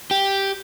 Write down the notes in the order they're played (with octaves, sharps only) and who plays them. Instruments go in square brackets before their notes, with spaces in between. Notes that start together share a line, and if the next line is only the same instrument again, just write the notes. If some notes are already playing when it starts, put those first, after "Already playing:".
[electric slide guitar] G4